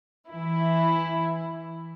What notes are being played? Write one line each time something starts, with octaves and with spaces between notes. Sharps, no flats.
E3 E4